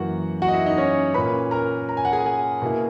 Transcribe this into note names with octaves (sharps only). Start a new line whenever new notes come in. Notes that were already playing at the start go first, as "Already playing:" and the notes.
Already playing: F#2 E3 A#3 F#4 F#5
F#4 F#5
D#5
E4 E5
D#4 D#5
C#4 C#5
A#2 A#3 C#4 B4 B5
A#4 A#5
A#5
G#5
F#5
G#4 G#5
G#4 G#5
B2 A#3 E4